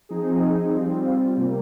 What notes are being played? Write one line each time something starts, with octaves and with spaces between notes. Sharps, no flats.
F3 C4 D#4 G#4
G3 C4 F4
C3 G3 A#3